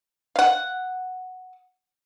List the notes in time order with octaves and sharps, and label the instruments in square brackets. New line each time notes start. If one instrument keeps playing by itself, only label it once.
[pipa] F5 F#5